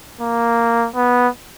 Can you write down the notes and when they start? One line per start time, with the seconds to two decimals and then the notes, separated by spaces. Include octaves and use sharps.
0.21 A#3
0.95 B3